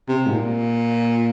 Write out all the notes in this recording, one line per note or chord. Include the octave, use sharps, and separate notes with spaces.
C3
G#2
A#2